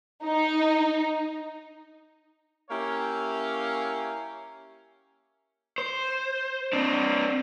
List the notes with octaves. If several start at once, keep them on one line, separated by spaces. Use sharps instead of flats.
D#4
A#3 C#4 E4 G4 C#5 F5
C5
C4 D4